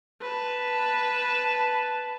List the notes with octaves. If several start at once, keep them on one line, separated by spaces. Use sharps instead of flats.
B4 A5